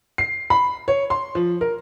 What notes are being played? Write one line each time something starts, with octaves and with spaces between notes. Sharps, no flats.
C7
B5
C#5
C6
F3
A#4